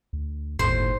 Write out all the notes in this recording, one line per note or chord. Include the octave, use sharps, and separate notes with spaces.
D2
G1 D#2 A2 C5